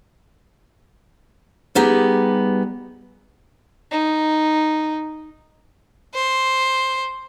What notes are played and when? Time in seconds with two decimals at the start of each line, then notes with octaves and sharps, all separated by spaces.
1.75 G3 B3 D#4 G4 G#4
3.91 D#4
6.14 C5